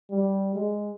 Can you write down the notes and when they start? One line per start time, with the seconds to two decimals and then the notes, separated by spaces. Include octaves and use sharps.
0.10 G3
0.55 G#3